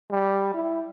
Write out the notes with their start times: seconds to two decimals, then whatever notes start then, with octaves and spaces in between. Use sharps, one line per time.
0.10 G3
0.54 E4